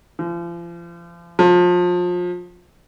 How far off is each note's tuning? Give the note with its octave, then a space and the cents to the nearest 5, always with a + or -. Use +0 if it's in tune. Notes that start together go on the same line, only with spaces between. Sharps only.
F3 -35
F3 +30